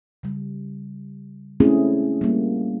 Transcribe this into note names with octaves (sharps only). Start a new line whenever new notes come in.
C#3 G3
G#3 A3 C4 C#4 E4 G#4
G3 A#3